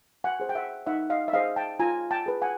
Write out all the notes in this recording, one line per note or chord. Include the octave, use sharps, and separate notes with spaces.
F#5 G#5
G#4 C5
G5
E5 F#5
D#4 E5 F#5
D#5 F5
E5
G#4 C5 D#5 F5
G5 A5
F4 G#5 A#5
G5 A5
G#4 B4
F#5 G#5